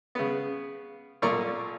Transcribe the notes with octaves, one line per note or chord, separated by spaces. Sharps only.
C#3 B3
B1 A#2 F4 A#4 D5 C#6